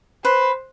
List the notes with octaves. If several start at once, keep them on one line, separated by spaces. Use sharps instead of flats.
B4 C5